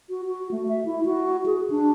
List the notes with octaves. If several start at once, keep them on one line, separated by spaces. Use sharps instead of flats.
F#4
F#4
A3
E5
E4
F#4
G#4
D4